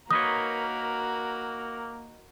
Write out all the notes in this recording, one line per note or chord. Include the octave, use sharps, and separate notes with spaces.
A#3 D#4 F#4 A#4 B4 C#5 D#6